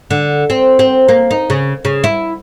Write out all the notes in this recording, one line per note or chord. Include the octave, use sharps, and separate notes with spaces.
D3
C4
C4
A#3
D#4
C#3
C#3
E4